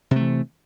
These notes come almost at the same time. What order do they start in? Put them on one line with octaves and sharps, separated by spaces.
C3 A3 E3